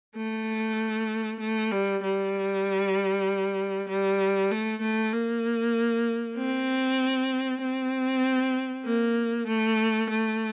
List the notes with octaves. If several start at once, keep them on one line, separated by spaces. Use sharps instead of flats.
A3
A3
G3
G3
G3
A3
A3
A#3
C4
C4
A#3
A3
A3